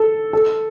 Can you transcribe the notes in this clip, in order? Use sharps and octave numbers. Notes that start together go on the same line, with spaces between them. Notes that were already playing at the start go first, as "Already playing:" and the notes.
Already playing: A4
A4